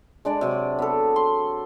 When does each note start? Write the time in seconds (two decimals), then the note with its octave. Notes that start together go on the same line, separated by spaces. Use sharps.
0.25 G#3 D4 D5
0.41 C3 F#3
0.79 B3 A4
1.16 C6